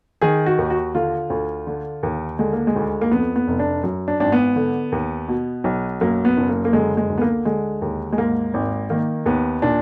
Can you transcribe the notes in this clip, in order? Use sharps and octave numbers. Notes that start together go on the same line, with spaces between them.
D#3 G#4
F#4
D#2
F#4
D3 F4
D2
D3
D#2
D3 G#3
A#3
G#3
D2
A#3
F2 B3
B3
F1
D4
F#2
D4
G#1 D4
B3
D3
D#2
B2
B1
F#2 A#3
B3
F#1
A#3
A#3
D3 G#3
G#3
D2
B3
A#3
D3 G#3
D#2
G#3
G#2 A#3
G#1
D#3 A#3
D#2 B3
A#2 D4